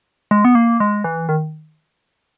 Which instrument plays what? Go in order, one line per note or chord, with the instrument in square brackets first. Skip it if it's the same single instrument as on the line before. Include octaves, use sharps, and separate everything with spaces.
[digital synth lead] G#3
B3
A#3
G#3
E3
D#3